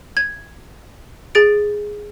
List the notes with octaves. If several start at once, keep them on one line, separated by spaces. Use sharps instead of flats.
G#6
G#4 A6 D7